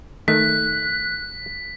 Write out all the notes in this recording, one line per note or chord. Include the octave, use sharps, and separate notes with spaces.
D#3 A3 F#6 B6